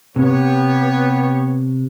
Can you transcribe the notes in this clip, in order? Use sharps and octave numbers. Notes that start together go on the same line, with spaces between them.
C3 B3 G4 C#5